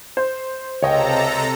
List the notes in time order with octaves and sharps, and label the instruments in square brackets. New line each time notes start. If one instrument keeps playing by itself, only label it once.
[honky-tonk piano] C5
[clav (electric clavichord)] C#2 [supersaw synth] C3 A4 A#5 [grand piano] C#5 D#5 G5